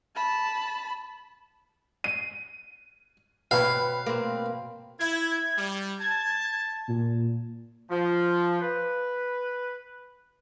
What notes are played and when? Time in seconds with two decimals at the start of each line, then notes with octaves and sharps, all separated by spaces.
0.15 A5 B5
2.04 C7 D#7
3.51 B2 C4 B4 C#5 F5 B5
4.06 A#3 C4
4.99 E4 G#6
5.57 G3
6.00 A5 G#6
6.88 A#2
7.91 F3
8.62 B4